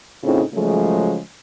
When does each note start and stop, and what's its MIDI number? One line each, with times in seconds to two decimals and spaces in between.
0.24 0.42 45
0.24 0.42 49
0.24 0.42 60
0.24 0.42 63
0.24 0.42 65
0.53 1.19 49
0.53 1.19 53
0.53 1.19 54
0.53 1.19 56
0.53 1.19 57